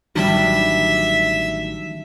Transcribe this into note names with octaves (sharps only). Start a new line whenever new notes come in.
A1 D#3 F#3 G3 D4 E5 E7